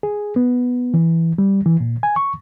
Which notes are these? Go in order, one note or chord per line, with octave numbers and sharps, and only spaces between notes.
G#4
B3
E3
G3
E3
A#2
G#5
C#6